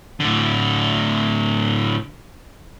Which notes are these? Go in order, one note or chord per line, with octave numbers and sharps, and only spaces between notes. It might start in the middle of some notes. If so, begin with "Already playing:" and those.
A2 D3